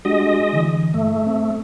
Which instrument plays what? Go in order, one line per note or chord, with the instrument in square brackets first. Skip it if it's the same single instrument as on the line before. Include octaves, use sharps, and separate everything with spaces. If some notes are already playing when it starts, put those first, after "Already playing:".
[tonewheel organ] G#3 D#5 [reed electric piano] D4 F#4 G4
[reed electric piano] D3 E3
[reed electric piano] G2 [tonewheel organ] A3
[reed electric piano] C4